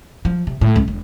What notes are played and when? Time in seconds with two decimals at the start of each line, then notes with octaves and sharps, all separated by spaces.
0.25 F3
0.47 C3
0.61 A2
0.76 C#2
0.88 E1